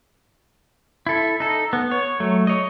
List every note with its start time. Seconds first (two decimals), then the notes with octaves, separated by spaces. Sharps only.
1.07 E4 A4
1.40 D#4 A4
1.73 B3
1.91 C#5
2.20 F#3 A3
2.47 C#5 D#5